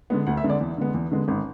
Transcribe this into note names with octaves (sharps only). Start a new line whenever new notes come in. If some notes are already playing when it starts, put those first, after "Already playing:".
D3 G#3 B3
D2 F#5
E5
D3 G#3 B3
D5
E2
D3 G#3 B3
E2
D3 G#3 B3
G#1